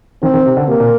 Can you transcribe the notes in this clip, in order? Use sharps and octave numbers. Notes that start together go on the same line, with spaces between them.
D#3 C4
D#3
C3
D3
C3 A#3
A#2